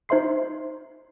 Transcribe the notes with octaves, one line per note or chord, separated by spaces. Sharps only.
D#4 C5 E5 C6 C7